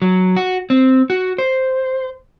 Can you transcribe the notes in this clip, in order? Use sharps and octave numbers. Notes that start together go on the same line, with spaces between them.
F#3
F#4
C4
F#4
C5